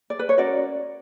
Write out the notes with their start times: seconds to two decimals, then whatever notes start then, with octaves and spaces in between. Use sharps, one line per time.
0.10 D5
0.19 B4
0.29 C#5
0.38 C#4 F#4 A#4 D5